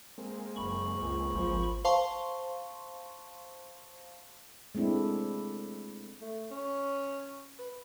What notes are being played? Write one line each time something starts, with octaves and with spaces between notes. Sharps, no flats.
G#3 A#3 C4
F#1 B5 C#6
C#2
G#1 F3
C5 F5 A5 C6 C#6
G#3 A3 C4 D4 E4
A3
C#4
B4